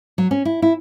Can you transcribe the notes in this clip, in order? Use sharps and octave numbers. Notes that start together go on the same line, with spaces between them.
F#3
C#4
E4
E4